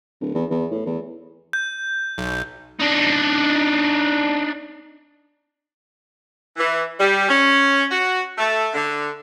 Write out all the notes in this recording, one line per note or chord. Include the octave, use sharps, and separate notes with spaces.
D1
E2
E2
A2
E2
G6
B1
D4 D#4
E3
G3
C#4
F#4
A3
D3